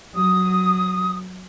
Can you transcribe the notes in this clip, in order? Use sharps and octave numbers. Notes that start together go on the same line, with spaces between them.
F#3 D#6